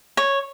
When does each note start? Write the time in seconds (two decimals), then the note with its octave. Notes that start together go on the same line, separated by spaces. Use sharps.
0.17 C#5